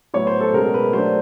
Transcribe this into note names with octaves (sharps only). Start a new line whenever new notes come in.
A2 F#3 B3 E4 C#5
C5
A4
B2 G#3 C#4 A#4
B4
F#3 A3 D4 C5